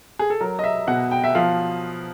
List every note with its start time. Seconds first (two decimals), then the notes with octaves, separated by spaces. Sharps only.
0.19 G#4
0.30 A4
0.40 F#3 A#4
0.59 D#5
0.64 E5
0.87 B2 F#5
1.11 G5
1.24 E5
1.35 F3 F5